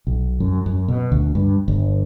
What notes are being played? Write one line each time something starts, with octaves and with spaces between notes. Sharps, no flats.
B1
F#2
F#2
B2
D2
G2
G1